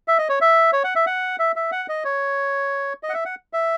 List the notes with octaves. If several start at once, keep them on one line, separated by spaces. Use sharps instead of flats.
E5
D#5
C#5
E5
C#5
F#5
E5
F#5
E5
E5
F#5
D#5
C#5
D#5
F#5
E5
F#5
E5